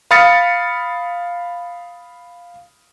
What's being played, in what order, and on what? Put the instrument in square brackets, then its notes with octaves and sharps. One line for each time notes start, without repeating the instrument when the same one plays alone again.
[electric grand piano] F5 B5 D#6 F6 A6 C#7